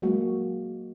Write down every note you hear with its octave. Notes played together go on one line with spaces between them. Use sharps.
F#3 G#3 A#3 F#4